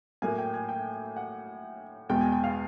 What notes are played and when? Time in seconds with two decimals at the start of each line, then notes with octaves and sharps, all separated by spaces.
0.22 A2 F#3 A#3 G#5
0.38 G5
0.54 G#5
0.69 G5
1.16 F#5
2.09 E2 B2 G#3 G5
2.21 G#5
2.32 G5
2.44 F5